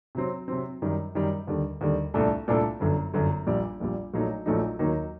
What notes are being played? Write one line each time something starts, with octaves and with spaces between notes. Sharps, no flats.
C3 F#3 C4
C3 F#3 C4
F#2 D#3 G3
F#2 D#3 G3
D#2 D3 G3
D#2 D3 G3
C2 A#2 A3 D4 A4
C2 A#2 A3 D4 A4
G1 F#2 D3
G1 F#2 D3
A#1 A#2 G3
A#1 A#2 G3
A#1 A#2 F#3 A3 D#4
A#1 A#2 F#3 A3 D#4
D#2 D#3 F#3 A#3 D#4